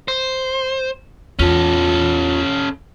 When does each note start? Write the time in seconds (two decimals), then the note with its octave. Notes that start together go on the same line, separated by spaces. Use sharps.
0.08 C5
1.39 E2 C#4 F4 A4